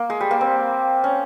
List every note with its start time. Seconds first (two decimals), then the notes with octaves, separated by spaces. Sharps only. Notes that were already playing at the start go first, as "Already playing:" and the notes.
Already playing: A#3
0.10 G#3
0.20 G3
0.31 A#3
0.41 C4
1.04 C#4